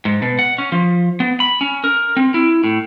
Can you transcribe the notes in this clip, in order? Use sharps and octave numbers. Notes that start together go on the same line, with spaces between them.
G#2
B2
F#5
C#4
F3
B3
B5
C#4
A#4
C4
E4
A2